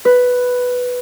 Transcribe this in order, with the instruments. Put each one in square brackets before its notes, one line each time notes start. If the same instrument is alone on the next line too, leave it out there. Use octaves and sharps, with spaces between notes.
[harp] B4